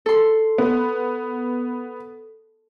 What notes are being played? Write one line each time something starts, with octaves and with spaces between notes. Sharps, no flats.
A4 C6
B3